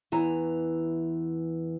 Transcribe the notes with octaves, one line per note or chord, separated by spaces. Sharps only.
E2 E3 A#5